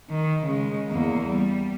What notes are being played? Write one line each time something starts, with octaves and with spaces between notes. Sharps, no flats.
D#3
C#3 G#3
E2 A#3
G3